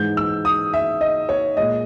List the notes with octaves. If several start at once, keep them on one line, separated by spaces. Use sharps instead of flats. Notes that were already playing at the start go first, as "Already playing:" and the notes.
Already playing: G#2 E3 G#3 G6
E6
D#6
E5
D#5
C#5
A#2 G#3 D#5